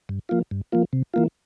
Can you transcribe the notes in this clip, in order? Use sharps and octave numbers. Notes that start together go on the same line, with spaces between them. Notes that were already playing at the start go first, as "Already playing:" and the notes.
G2
F3 A#3 F4
G2
F3 A#3 F4
C3
E3 A#3 F4